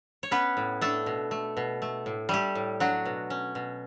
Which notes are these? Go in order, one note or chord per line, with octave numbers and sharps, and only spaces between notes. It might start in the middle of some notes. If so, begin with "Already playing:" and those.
C#5
B3 C#4 B4
A2
A3 D4 A4
B2
A3
B2
A3
A2
G3 A3 G4
A2
F#3 D4 F#4
B2
C#4
B2